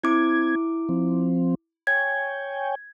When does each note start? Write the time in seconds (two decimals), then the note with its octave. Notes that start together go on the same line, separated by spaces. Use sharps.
0.04 C4 E4 D6 G#6
0.89 F3 C4
1.87 C#5 G5 G#5 G#6